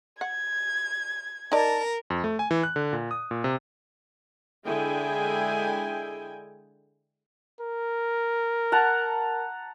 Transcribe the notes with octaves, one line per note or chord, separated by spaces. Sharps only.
F#5 G#6
D#4 A#4 D5 A5
F2
A3
G#5
E3
F#6
D3
A#2
D#6
A#2
C3
D3 G#3 E4 G#4 G5 G#5
A#4
F#5 A5 A#5